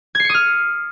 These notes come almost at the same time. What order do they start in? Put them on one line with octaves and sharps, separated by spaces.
G#6 C7 C#7 D#6 F6